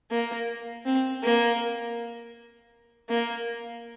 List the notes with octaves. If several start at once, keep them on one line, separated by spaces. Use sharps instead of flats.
A#3
C4
A#3
A#3